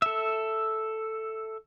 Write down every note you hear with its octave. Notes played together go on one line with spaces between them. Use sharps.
A4 E5